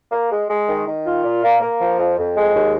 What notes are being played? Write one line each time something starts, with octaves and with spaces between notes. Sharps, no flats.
A#3
G#3
G#3
D#3
D#3
F4
A#2
A#3
A#3
F3
F2
F2
G#3
D#2